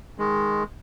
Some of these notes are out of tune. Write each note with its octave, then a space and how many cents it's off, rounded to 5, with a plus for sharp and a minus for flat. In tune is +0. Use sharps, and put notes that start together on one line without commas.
D#3 +0 G#3 +0